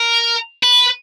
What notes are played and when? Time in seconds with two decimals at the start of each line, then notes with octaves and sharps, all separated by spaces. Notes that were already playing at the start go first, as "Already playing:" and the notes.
Already playing: A#4
0.63 B4